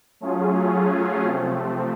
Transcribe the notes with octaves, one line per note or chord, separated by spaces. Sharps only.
F#3 A3 C#4 F4 G#4
C3 F3 A3 C4